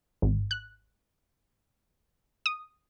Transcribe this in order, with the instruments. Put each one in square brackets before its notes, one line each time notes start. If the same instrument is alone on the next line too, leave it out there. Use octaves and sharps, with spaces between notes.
[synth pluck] G#1
F#6
D#6